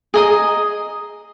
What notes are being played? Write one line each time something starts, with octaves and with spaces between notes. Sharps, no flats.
G#4 D#5 A#5 D#6